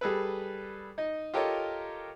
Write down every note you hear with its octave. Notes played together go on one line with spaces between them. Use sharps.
G3 G#4 A4 B4
D#4 D#5
F4 G4 A4 A#4 C#5 D#5